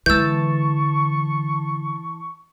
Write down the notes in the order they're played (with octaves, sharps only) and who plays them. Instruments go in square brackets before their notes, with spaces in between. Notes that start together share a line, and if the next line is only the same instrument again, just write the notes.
[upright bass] D3 G#3 [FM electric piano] E3 A5 [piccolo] C#6 [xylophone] E6 G6